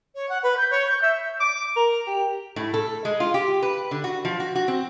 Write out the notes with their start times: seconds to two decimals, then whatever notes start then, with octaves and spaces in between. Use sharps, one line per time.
0.15 C#5
0.29 F#5
0.43 B4
0.58 G6
0.71 C#5
0.88 G6
1.02 E5
1.40 D6
1.76 A#4
2.07 G4
2.56 A2
2.74 A4
3.05 G#3
3.20 F4
3.34 G4
3.62 B4
3.91 D3
4.04 F#4
4.25 F3
4.40 F#4
4.55 F#4
4.68 C4